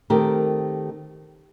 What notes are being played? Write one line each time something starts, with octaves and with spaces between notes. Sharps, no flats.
D#3 A3 C4 G4 A#4